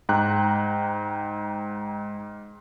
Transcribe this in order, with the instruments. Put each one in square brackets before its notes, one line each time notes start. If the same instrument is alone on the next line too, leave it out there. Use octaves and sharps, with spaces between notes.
[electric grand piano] G#2 G5 A#5 F#6